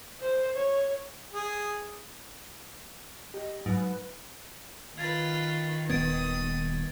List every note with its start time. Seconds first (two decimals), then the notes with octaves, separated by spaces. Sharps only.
0.21 C5
0.56 C#5
1.33 G#4
3.34 G4 D#5
3.66 G#2 F#3 B4
4.98 D#3 F4 B4 G#6 A6
5.89 D#1 B3 D#6 G#6 A6 D7